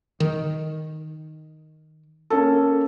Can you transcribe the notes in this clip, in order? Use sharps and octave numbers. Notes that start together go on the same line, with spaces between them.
D#3
A#3 C#4 A4